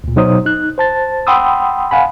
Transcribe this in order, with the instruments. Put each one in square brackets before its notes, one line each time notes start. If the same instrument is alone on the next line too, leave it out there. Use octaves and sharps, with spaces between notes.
[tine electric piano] D2 A#2
B2 F#3 D#4 F#4 C5 D#6
D#4 F#6
C5 A5 A6
F#5 G5 B5 C6 D#6 E6
F5 F#5 G#5 B5